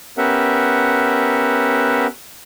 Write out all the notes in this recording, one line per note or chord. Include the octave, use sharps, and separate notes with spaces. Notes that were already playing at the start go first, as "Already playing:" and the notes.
B3 C#4 G4 A#4 E5 F#5